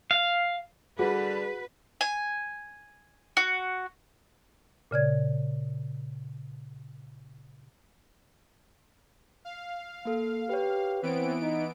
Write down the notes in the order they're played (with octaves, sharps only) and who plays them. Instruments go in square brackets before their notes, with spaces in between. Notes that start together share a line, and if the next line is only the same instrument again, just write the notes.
[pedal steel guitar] F5
[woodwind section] D3 G3 [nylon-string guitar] F#4 [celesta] G#4 [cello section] B4
[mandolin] G#5
F#4
[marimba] A#2 C#3 D5 G#6
[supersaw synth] F5
[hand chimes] A#3 A4
[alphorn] G4 [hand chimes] B4 C#5
[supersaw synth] E3 B3 D7 [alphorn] C4
[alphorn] D#4